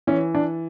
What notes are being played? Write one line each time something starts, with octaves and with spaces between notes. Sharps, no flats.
E3 C#4
D4